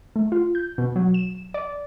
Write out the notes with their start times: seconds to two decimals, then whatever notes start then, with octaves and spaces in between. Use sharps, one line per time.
0.16 A3
0.32 F4
0.55 G6
0.78 B2
0.96 F#3
1.14 E7
1.54 D5